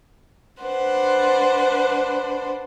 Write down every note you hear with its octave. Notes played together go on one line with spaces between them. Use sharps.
D4 B4 C5 F#5